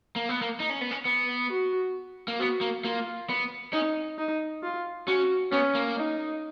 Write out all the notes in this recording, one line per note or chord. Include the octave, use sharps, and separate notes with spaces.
A#3
B3
A#3
D#4
C#4
B3
C#4
B3
F#4
A#3
B3 F#4
A#3
A#3 F4
B3
C#4 D#4
D#4
F4
C#4 F#4
B3 C#4
A#3
D#4